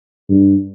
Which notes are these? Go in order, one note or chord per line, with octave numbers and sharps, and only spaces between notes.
G2